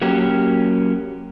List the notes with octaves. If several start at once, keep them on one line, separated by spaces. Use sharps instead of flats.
F#3 A#3 C#4 G4